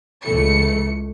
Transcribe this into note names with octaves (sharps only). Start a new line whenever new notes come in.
C#2 E3 A3 C#7